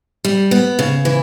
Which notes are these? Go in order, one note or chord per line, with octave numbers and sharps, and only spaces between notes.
G3
B3
C#3
E3